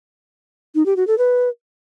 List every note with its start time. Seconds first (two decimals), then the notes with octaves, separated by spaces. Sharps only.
0.75 D#4
0.86 G4
0.96 F#4
1.07 A4
1.18 B4